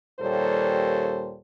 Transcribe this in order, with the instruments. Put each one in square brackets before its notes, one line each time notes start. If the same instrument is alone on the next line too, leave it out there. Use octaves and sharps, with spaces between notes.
[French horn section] D#2 A#2 G3 A4 C5 C#5